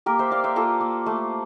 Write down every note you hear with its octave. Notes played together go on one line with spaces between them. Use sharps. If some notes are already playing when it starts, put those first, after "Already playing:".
A#3 G4 A#4
C5 E5
A#3 D5 F5
C5 E5
A#3 F4 A4
A#3
A3